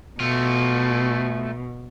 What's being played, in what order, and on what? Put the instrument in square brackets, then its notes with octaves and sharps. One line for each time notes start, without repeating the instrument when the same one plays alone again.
[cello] B2 [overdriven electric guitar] A3 F4